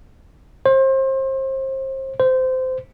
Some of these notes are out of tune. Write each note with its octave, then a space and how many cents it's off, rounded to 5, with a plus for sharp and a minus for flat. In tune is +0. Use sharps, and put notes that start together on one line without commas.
C5 +30
C5 -20